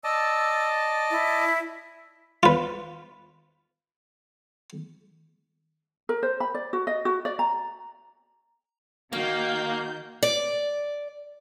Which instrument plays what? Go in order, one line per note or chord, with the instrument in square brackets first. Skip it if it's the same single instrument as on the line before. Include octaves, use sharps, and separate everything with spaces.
[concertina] D5 D#5 A5 [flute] E6
[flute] E4
[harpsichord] F4 B4
[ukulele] A#4
C5
B5
D5
F#4
D#5
F#4
D5
A#5
[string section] D#3 G6 [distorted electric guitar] A#3 [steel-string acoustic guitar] F#4 [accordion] F5
[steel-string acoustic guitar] D5